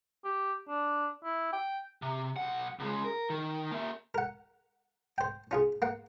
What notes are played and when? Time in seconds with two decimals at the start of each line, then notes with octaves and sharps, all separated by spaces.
0.24 G4
0.69 D4
1.24 E4
1.53 G5
2.02 C3
2.36 B1 F#5
2.79 C#2 G#3
3.05 A#4
3.30 D#3
3.71 A#3 E5
4.14 A#4 F#5
5.18 C5 G5
5.51 C#4 F4 G#4
5.82 A#3 F#5